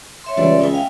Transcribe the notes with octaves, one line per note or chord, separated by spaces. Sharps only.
C#5 E5 C6
C#2 E3 G3 D5
G#3 C#4 E5
F5 G5